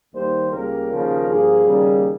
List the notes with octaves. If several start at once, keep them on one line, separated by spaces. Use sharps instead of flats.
D#2 D#3 G3 A#3 C5
C#2 C#3 G3 A#3 A#4
D#2 C#3 F3 A#3
G2 F3 A#3 G#4
D#2 C#3 G3 A#3